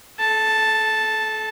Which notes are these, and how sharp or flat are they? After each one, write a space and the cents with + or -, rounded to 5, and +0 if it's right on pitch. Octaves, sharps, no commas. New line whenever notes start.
A4 -30 A5 +0